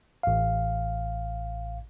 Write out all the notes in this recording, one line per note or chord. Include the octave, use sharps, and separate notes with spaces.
A1 F5